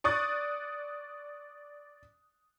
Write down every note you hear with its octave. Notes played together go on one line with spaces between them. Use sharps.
D5 C#6 D#6 F#6 A6